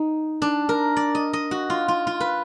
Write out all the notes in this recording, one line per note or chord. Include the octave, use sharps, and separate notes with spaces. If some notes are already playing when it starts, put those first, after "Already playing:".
Already playing: D#4
D4
A#4
D5
D#5
D#5
F#4
F4
F4
F4
B4